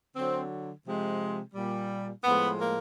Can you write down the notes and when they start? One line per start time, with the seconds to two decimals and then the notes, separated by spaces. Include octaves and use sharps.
0.16 D3 F#3 C4
0.86 C3 F3 G#3
1.54 A#2 G3
2.24 A2 F3 G#3 B3
2.59 A#3